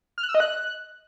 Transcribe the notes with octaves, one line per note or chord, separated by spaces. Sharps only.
F6
F#6
E6
D#5
F#6